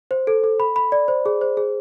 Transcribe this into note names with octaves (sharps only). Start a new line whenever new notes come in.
C5
A4
A4
B5
B5
D5
C5
G#4
C5
G#4